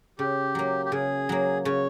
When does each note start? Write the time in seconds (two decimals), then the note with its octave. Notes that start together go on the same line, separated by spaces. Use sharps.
0.19 C#3 G4
0.55 F#3 A#3
0.85 G4
0.92 C#3 G#4
1.29 F#3 A#3
1.65 C#3 C#5